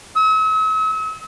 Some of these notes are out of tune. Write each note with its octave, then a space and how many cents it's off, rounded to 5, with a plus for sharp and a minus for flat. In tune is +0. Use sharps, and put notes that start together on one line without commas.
E6 -45